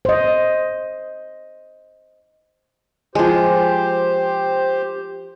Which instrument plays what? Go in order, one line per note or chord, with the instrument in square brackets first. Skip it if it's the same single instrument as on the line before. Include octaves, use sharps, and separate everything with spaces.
[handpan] C5 D#5
[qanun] F3 G#3 [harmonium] G4 C5